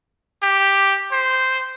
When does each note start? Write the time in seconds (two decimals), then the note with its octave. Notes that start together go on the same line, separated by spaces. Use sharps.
0.43 G4
1.12 C5